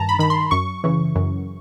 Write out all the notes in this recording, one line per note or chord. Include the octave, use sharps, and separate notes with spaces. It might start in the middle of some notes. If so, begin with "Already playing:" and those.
Already playing: G2 D#3 A5 A#5
B5
D#3 B5
C6
F#2 C#6
C#3 E3
F#2